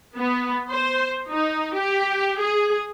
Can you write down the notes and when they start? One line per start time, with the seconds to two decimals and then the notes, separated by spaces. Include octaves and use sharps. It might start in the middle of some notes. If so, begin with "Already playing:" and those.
0.17 B3
0.70 C5
1.29 D#4
1.75 G4
2.39 G#4